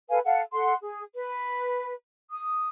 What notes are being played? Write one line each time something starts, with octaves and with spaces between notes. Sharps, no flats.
A4 B4 F5 G#5
A4 F5 F#5
A4 F#5 C6
G#4
B4
D#6